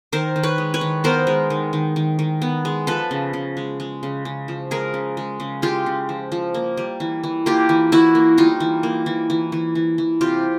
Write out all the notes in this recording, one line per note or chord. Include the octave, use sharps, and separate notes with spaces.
D#3 A#4 C5
D#3
B4 C#5
G#3
B4 C#5
D#3
B3 A#4 C5
G#3
D#3
D#3
D#3
D#3
B3
G#3
F3 A4 B4
C#3
C#3
G#3
G#3
C#3
C#3
F3
G#3 G#4 A#4
C#3
G#3
C#3
G#3 F4 G4
C#3
F3
F3
A#3
G3
E3
E3
A#3 F4 G4
E3
E3 E4 F#4
A#3
G3 D#4 F4
E3
A#3
E3
E3
E3
E3
E3
C3 F4 G4